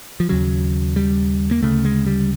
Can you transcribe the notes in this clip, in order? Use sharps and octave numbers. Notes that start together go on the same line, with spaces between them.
F3
D#2 C#3 F#3
G3
A#3
D2 C#3 A3
G#3
G3